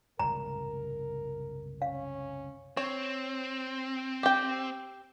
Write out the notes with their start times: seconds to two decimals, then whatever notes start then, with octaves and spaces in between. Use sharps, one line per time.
0.19 F#1 C2 G#2 A#4 A#5
1.82 C#4 F5
2.77 C4 C#5
4.23 G4 G5